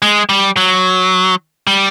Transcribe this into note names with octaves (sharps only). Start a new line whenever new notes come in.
G#3
G3
F#3
G3